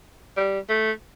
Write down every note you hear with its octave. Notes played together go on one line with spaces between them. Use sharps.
G3
A3